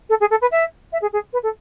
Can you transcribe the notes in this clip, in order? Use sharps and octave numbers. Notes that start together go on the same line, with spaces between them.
A4
G#4
A4
B4
E5
E5
G#4
G#4
B4
A4